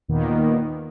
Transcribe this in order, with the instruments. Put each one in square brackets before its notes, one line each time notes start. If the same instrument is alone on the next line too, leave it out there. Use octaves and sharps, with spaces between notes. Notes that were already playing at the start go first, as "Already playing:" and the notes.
[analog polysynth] D#2 A#2 D#3 A#3 B3